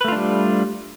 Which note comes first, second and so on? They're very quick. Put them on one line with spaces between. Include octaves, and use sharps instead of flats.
B4 A3 F4 D4 G3